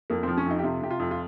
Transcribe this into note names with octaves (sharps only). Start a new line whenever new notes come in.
F2 A#3
F3 C4
C#4
F2 D#4
G4
C3 F4
C3 G4
F4
F2
F4